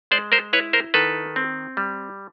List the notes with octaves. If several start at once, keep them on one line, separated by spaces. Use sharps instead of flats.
G#3 C5 D5
A#4 C5
E4 B4 C#5
A#4 C5
D#3 A4 B4
C4
G3